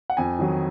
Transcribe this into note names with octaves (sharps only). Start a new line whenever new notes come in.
F#5
F2 G#5
D#3 F#3